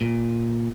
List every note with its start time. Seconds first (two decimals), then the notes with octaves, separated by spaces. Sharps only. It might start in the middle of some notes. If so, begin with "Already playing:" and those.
0.01 A#2